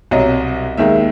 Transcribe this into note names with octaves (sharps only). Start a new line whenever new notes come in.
C2 B2 F#3 D#5
D#2 D#3 G#3 E5